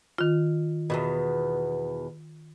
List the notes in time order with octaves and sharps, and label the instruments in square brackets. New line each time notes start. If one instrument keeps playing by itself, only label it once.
[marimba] D#3 F4
[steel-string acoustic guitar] E2 G2 B2